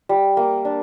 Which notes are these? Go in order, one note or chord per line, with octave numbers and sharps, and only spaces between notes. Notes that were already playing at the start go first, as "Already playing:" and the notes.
G3
A#3
D4